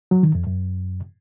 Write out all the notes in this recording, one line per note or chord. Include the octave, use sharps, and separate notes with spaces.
F#3
D#3
F2
F#2